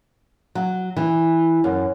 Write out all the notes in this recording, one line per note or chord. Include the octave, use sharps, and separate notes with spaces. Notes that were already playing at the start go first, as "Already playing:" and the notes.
F#3
E3
F#2